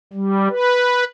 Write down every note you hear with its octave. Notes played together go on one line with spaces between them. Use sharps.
G3
B4